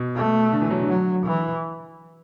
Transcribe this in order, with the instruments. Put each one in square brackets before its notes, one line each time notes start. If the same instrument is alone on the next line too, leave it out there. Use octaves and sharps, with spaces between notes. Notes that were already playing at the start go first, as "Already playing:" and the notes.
Already playing: [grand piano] B2
[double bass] A3
[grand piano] D3
E3
F#3
D3
[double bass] F#3
E3